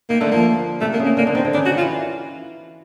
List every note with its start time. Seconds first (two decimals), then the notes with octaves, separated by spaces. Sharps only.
0.10 D#3 A#3
0.20 D3 A3
0.31 F3 A#3
0.81 C3 A3
0.93 A#3
0.99 C#3
1.06 A#3
1.17 D3 A#3
1.27 D3
1.35 D#3 C4
1.45 D3
1.54 C#3 D4
1.65 F#4
1.72 D#3
1.77 F4
1.81 E3